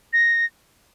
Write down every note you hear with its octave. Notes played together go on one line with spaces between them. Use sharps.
A#6